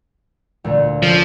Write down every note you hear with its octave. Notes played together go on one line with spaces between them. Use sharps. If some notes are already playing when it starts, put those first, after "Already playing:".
D2 A#2 A3
F3 C#4 A4 C5